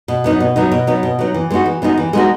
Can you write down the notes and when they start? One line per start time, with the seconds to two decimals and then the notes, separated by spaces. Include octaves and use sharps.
0.08 B2
0.24 F#3 B3 D#4
0.40 B2
0.56 F#3 B3 D#4
0.72 B2
0.87 F#3 B3 D#4
1.03 B2
1.19 F#3 B3 D#4
1.34 E3
1.50 G#3 B3 D#4 F#4
1.66 E3
1.82 G#3 B3 D#4 F#4
1.98 E3
2.13 G#3 B3 D#4 F#4